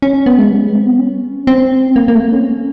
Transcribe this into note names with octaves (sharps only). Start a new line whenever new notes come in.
C#4
B3
G#3
G3
G#3
C4
B3
C#4
C4
A#3
A#3
A3
A#3
C#4